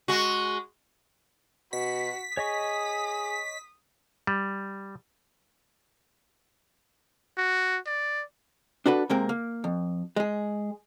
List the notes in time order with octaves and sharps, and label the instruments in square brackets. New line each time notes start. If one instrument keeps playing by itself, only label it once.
[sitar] G#3 F#4
[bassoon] B2 [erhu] F#4 [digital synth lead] B6
[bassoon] G#4 [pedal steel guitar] C#5 D#5 C#6 [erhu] D#6
[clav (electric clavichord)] G3
[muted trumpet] F#4
D5
[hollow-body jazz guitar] D4 F#4 A4 B4
C3 G#3 A#3 C4 A#4
A#3
F2
G#3 G#4